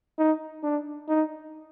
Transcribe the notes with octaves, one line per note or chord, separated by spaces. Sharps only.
D#4
D4
D#4